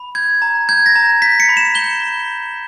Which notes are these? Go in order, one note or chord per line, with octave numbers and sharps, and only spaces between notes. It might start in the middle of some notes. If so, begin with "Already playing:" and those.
Already playing: B5
G6 G#6
A#5
G6 G#6
A#6
A#5
G6 B6
C#7
B5
E7
G6 G7
B5